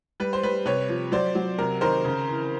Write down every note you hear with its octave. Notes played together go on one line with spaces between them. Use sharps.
G3 B4
C5
G3 B4
C3 B4 C#5
F3
F#3 C5 D5
F#3
C3 A#4
D#3 A#4 C5
C#3
E3